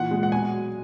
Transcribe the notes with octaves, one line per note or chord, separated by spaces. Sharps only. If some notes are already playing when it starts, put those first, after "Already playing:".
Already playing: A#2 E3 F#5
G#3
F#5
B2 G#5
F#3